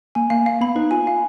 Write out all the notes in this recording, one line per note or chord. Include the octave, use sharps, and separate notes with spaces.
A#3 G#5
A#3 F5
F5
B3 B5
D#4 B4
F4 G#5
F5